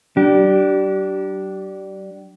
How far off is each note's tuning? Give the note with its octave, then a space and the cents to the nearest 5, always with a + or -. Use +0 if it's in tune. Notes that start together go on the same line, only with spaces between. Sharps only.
F#3 +45 D4 +0 G4 -30